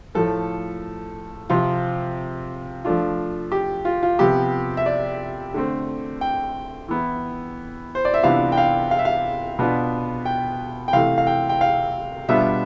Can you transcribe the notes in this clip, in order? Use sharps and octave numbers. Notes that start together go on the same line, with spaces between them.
A2 F3 A3 A4
C3 F3 C4 F4
F3 A3 D4 F4
G4
F4
F4
C3 F3 B3 G4
E5
D5
D3 A3 C4
G5
E3 B3 E4
C5
D5
E5
C3 E3 B3 D4 F4 F5
G5
F5
F5
E5
F5
B2 B3 D4 F4
G5
G5
C3 E3 A3 F5
F5
G5
G5
F5
B2 G3 B3 D4 F4 E5